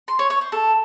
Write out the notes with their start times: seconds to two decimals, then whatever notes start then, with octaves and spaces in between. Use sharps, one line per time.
0.08 C6
0.19 C#5
0.30 C#5
0.41 C5
0.52 A4